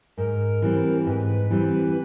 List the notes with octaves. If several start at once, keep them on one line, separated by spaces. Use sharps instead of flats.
G#2 A#4
E3 G3 C4
G#2 B4
E3 G3 C4